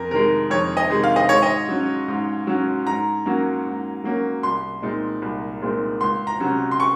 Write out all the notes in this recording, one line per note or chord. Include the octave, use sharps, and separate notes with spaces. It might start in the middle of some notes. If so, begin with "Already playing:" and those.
Already playing: F2 A#4
C3 D#3 G#3 A#4
F2 C#5
D#5
C3 D#3 G#3
F5
D#5
G#2 C#5
D#5
F#3 C#4
G#2
F#3 C#4
G#2 A#5
F#3 A#3 C#4
G#2
F#3 A#3 C#4
C2 C6
A#2 G#3 C4 D#4
C2
A#2 G#3 C4 D#4
C#2 C6
A#5
C3 F#3 C#4
C6
C#6